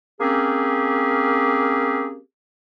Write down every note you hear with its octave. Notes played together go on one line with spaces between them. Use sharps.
A#3 C4 C#4 G4 G#4